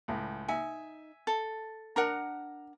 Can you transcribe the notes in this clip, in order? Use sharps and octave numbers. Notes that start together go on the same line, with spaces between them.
C#2 A2
D#4 E5 G#5
A4
D4 A#4 F#5 A#5